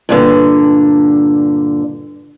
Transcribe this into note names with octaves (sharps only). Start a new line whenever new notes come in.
G2 A#2 D3